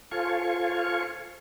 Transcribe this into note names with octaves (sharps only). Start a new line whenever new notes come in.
F4 A4 C5 F5 G#5 C#6